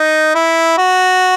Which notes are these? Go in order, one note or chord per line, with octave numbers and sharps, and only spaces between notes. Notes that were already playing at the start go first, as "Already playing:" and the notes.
Already playing: D#4
E4
F#4